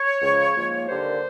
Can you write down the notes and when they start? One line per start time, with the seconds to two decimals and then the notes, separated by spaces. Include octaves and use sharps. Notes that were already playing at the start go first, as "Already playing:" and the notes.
Already playing: C#5
0.21 C#2 C#3 F3
0.55 G#2 F3 A#3
0.88 D#2 D3 G3 A#3 C5